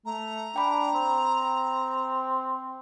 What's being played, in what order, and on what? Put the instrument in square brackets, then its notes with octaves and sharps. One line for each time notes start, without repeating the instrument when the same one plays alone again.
[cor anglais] A3 [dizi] A#5
[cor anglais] D4 [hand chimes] G5 B5
[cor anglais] C4